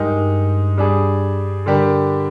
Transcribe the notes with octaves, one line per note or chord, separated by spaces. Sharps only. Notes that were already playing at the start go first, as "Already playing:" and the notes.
Already playing: G2 G#3 D#4 G4 A#4
G3 D4 G#4
D3 G3 D4 G4 A#4